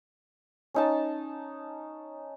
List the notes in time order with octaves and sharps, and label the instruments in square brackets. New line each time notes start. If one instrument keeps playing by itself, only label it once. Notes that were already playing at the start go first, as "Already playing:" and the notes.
[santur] C#4 D#4 A5